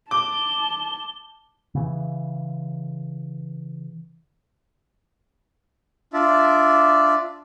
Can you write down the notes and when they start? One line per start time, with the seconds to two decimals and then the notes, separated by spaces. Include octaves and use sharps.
0.11 A5 D6 G7
1.75 C#3 E3
6.13 D4 F4 D5 E5